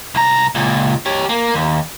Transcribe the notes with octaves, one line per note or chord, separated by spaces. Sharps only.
C2 A#5
C#2 A#2
G4 C#5
A#3
D#2